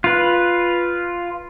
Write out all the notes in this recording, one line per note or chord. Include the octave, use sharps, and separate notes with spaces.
F4 B4